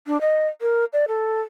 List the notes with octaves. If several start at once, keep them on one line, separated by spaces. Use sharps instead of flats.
D4
D#5
A#4
D5
A4